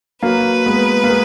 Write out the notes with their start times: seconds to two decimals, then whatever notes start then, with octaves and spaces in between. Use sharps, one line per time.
0.23 F#3 A#3 B4
0.66 G#3 B3
1.04 A#3
1.09 G#3 B3